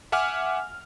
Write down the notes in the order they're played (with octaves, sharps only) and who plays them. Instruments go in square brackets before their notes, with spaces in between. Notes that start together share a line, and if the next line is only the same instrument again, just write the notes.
[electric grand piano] E5 F#5 G#5 D6 F6